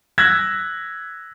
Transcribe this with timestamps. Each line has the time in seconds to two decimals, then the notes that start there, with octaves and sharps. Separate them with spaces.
0.18 E6 F#6 G#6 A#6 B6